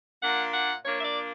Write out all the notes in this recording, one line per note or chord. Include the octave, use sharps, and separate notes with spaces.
A#2 A#3 D4 F#5
F#5
A#2 A#3 D4 C#5
E5
D5